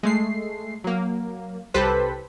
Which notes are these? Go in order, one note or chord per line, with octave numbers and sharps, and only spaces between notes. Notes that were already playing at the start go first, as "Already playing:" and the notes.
G#3 A3 C7
F#3 A#3
C2 G4 A4 B4 C5 B6